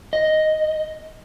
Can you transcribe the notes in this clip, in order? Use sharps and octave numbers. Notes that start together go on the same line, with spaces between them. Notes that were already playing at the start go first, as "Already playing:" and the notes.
D#5